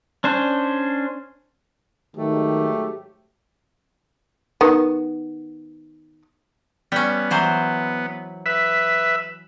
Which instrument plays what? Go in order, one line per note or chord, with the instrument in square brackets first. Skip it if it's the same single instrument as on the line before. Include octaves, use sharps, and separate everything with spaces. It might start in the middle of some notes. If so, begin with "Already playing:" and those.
[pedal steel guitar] C#4 D4 C5
[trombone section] G#2 F#3 G4 [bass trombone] D#3 [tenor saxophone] A3
[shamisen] D#3 B3
[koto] G3 C#4 [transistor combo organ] B3
[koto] E3 F#3 C5
[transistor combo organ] B4 E5